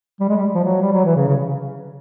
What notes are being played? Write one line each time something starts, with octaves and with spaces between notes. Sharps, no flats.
G3
G#3
G3
F3
F#3
G3
F#3
E3
C#3
C#3